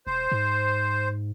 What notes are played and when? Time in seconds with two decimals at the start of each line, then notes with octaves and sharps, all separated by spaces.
0.07 E1 C5
0.32 G#2